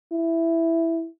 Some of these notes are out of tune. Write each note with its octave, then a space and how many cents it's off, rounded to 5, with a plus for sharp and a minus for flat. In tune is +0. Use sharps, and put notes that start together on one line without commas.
E4 +5